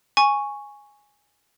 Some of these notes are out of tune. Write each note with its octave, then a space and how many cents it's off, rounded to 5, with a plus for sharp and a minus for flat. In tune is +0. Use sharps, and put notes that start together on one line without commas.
G#5 -5 C#6 +0